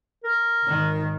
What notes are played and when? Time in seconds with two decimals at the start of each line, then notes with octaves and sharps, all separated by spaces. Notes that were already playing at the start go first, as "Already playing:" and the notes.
0.24 A#4
0.64 G#1 D#3